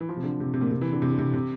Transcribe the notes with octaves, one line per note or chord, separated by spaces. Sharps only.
E3
F3
C3
D3
C3
C3
A#2
C3
E3
D3
C3
D3
C3
C3